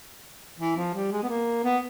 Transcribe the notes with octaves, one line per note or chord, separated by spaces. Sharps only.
E3
F3
G3
G#3
B3
A#3
B3